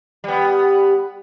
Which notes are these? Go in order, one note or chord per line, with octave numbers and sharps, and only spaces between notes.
G3 B3